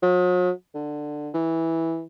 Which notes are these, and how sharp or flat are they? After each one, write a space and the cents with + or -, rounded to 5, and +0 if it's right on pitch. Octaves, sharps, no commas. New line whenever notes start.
F#3 -45
D3 +15
E3 -10